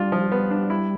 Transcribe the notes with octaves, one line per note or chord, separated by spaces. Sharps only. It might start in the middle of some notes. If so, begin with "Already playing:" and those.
Already playing: G3 D4 F4
F3
B3
D4
E4